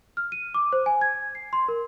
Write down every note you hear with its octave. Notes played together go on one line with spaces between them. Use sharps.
F6
D#7
D6
C5
G#5
G#6
C7
C6
A#4